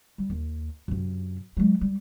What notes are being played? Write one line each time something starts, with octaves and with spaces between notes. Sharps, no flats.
G3
D#2
F#2 C3
F#3 G#3
G3